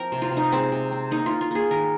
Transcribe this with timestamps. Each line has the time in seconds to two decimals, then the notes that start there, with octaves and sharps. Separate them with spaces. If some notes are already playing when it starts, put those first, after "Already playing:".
Already playing: F3 C4 A#4
0.12 C3
0.22 F4
0.31 C3
0.37 D#4
0.52 G#3 C4
0.72 C3
0.92 C4
1.11 A#3 D#4
1.26 A#3 F4
1.41 F4
1.51 A#3 G#4
1.71 D#3 A#4